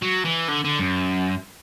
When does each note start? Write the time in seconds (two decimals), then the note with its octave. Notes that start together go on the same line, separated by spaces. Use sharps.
0.02 F#3
0.25 E3
0.49 D3
0.65 D3
0.79 F#2